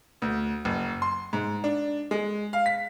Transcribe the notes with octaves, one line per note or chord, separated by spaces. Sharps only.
D2
F#1
C6
G#2
D4
G#3
F5
B6